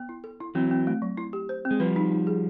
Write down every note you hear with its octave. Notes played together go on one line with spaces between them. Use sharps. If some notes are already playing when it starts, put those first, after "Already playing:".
Already playing: B3
E4
A4
E4
E3 F#3 C4
C4
A3
F#3
E4
G4
C5
C4
G#3
F3 G3 B4
D#4
D#4
G#4